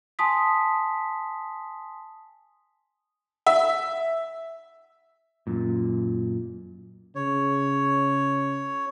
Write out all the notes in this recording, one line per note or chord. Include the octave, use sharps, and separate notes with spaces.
G#5 A5 C6 D#6 B6
E5
F#2 A#2
C#3 C#5